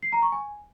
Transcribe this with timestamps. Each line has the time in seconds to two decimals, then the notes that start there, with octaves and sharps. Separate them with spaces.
0.03 C7
0.12 A#5
0.22 C#6
0.32 G#5